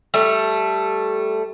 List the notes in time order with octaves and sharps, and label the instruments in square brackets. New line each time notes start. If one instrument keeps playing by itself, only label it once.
[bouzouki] G3 A3